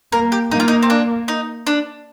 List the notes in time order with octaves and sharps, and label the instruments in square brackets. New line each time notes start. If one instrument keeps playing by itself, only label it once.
[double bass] A#3 [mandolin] A#4
[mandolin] G4
[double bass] A#3 [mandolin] D#4
[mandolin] F4
D#4
C4
D4
D#4
D4